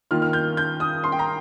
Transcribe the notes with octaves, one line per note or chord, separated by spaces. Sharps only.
D#3 A#3 F4 F6
F6
G6
G6
D#6
C6
G5
A#5